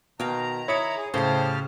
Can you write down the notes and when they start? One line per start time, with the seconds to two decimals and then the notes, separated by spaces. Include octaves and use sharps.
0.20 B2 D#3 F5 G5 A#5
0.68 E4 C#5 D#6 C#7
0.97 G#4
1.14 A2 C#3 G4 C5 A5 C6 F6